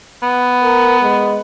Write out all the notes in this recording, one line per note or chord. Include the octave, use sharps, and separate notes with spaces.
B3
A#4
G#3